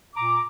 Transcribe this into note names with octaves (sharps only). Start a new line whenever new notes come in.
A#2 A#5 D6